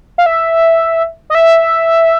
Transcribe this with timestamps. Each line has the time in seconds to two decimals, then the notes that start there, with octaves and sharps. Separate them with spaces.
0.18 F5
0.26 E5
1.30 D#5
1.35 E5